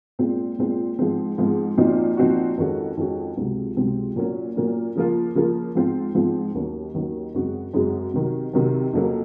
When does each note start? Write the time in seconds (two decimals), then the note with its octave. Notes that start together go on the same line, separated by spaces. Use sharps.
0.19 A#2 G#3 C4 F4
0.59 A#2 G#3 C4 F4
0.99 G#2 F3 G#3 C4
1.38 G#2 F3 G#3 C4
1.77 A#2 F3 C4 D#4 F#4
2.17 A#2 F3 C4 D#4 F#4
2.57 F2 D#3 G#3 C#4 F#4
2.97 F2 D#3 G#3 C#4 F#4
3.37 C#2 C3 F#3 C4
3.76 C#2 C3 F#3 C4
4.16 A#2 F#3 A#3 C#4
4.56 A#2 F#3 A#3 C#4
4.95 C#3 F3 A#3 F4
5.35 C#3 F3 A#3 F4
5.75 G#2 F3 C4 F4
6.15 G#2 F3 C4 F4
6.55 D#2 D#3 F#3 C#4
6.94 D#2 D#3 F#3 C#4
7.34 F#2 C#3 G#3 C4 F#4
7.74 F#2 C#3 G#3 C4 F#4
8.14 C3 D#3 F#3
8.53 C3 D#3 F#3
8.93 F2 C#3 F#3 A#3